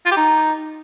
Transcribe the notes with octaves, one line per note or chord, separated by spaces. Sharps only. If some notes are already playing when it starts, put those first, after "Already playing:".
F4
G4
D#4